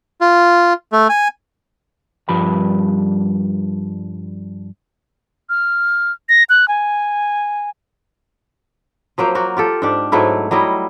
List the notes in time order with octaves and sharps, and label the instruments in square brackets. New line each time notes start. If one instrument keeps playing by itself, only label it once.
[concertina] F4
A3
G#5
[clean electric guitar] G2 F3 G3 B5
[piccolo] F6
A#6
F#6
G#5
[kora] F3 F#3 A#3 C5
A#3 F#4
F4 G4 A4
G#2 D4 G4
G#2 F#3 A3 E4
F#3 G3 E4 D#5